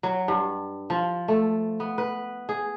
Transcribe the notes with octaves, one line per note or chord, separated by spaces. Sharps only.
F#3
G2
F3
A3
B3
B4
G#4